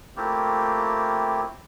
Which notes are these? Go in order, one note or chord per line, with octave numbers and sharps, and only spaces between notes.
A3 A#3 C4 E4 F4 G4